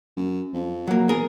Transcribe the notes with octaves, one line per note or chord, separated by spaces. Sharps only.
F#2
F2
F#3 A#3
E2 G#4 A#4